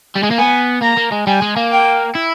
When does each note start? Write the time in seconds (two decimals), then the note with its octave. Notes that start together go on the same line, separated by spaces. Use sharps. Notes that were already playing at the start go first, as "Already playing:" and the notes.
0.15 G3
0.23 G#3
0.31 A#3
0.38 B3 G#5
0.82 A#3 A#5
0.97 A#3
1.12 G#3
1.27 G3 G#5
1.42 G#3
1.56 A#3
1.72 G5
2.15 E4